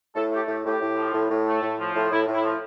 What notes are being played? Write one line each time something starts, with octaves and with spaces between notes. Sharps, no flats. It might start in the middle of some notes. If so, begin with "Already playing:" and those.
A2 A4
A3 G4
A2 G4
A2 G4
A2
F3
A2
A2
A3
A2
F3
A2
A2 E4
A2
E4
F3